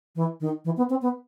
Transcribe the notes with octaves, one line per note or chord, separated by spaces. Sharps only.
E3
D#3
E3
B3
C4
B3